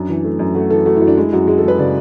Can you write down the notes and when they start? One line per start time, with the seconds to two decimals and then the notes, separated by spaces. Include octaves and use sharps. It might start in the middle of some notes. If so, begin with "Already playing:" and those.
Already playing: F#2 D4
0.09 E3
0.24 A3
0.39 F#2
0.55 A3 F#4
0.70 E3 A4
0.86 A3 F#4
0.97 E4
1.01 F#2
1.07 D4
1.17 G#3 E4
1.33 F#2 F#4
1.47 G#3 G#4
1.58 A4
1.64 G#3 B4
1.78 C#3 D5